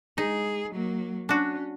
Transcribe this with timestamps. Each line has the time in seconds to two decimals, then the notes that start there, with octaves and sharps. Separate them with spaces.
0.18 G#3 D#4 G#4
0.71 F#3 A#3
1.29 C#4 D4 F#4